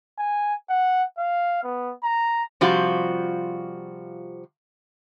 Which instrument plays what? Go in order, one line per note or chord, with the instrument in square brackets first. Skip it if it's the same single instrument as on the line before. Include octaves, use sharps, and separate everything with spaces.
[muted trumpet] G#5
F#5
F5
B3
A#5
[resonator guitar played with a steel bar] C3 F3 G3 F4 F#4